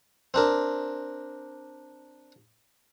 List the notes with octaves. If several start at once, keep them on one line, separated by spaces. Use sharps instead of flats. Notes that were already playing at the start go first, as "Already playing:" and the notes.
C4 D4 A#4